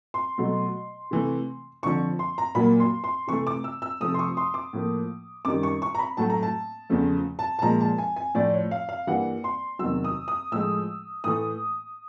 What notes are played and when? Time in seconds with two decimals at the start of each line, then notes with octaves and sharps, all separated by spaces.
0.14 C6
0.38 B2 F#3 A3
1.11 C3 E3 A3
1.83 F2 D3 F3 C#6
2.19 C6
2.38 A#5
2.55 A#2 F#3 A#3 B5
2.80 C6
3.04 C6
3.27 C3 E3 A3 C#6
3.47 D6
3.64 E6
3.82 E6
4.00 C3 F3 A3 D#6
4.14 C6
4.19 C#6
4.37 C6
4.54 D6
4.73 A2 F3 A#3
5.45 F#2 D#3 G3 D6
5.63 C#6
5.82 C#6
5.95 A#5
5.99 B5
6.17 A2 F#3 A3 A5
6.30 A#5
6.43 A5
6.90 E2 C#3 F3 A3
7.39 A5
7.59 A5
7.62 A#2 F3 G#3 A#5
7.80 A5
7.98 G#5
8.16 G#5
8.35 A2 F3 A3 D5
8.54 C#5
8.71 F5
8.89 F5
9.07 G2 E3 G3 A#3 F#5
9.44 C6
9.79 E2 C3 D#3 F#3 E6
10.04 D#6
10.28 D#6
10.52 A2 F3 G#3 E6
11.24 A2 E3 A3 D#6